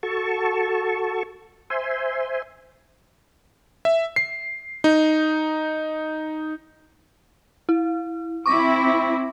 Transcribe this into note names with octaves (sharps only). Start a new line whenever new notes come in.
F#4 A4 A5 C#6
C5 E5 G#5 C6
E5
C7
D#4
E4
C4 E4 C#6 D6 A#6